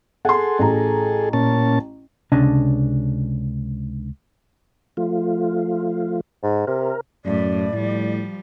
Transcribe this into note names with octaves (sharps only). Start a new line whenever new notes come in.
G#4 A4 F#5 C6
A1 A#5
A#2 C#4 A5
C#2 C3 C#4 D4 D#5 A5
F3 A3 F4
G#2
C3 A#4
F#2 A2 D5
A2 F3 G3